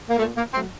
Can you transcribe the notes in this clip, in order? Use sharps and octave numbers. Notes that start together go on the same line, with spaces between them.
A#3
A#2 A3
A#3
F#3 A3 C4